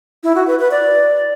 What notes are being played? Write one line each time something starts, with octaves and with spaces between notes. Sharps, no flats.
E4
F#4
B4
B4
D5